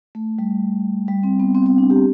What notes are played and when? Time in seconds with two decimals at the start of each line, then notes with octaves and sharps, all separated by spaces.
0.15 A3
0.39 G3
1.08 G3
1.23 C4
1.40 B3
1.55 C4
1.66 C4
1.78 D4
1.90 G4